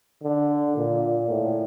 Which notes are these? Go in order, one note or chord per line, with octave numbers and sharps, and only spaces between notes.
D3
A#2
A2